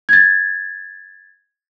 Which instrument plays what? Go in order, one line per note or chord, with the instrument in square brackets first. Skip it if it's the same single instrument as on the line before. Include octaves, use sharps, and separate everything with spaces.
[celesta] G#6 A6